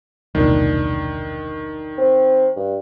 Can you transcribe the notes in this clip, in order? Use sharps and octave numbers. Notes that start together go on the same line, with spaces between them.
E1 C2 A#2 D#3 D4
C4
G2